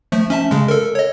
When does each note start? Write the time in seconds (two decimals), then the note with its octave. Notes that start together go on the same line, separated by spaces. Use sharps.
0.12 F3 A3
0.30 C#4 E5 A5
0.51 C#3 G#3
0.68 A4 A#4
0.95 C#5 D#5